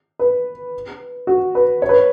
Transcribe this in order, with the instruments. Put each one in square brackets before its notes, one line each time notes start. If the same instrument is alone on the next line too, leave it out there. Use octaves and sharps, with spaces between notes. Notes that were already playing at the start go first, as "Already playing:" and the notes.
[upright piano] B4
F#4
B4
C#5
B4